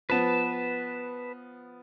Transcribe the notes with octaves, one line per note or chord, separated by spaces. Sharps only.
F3 B3 B4 A5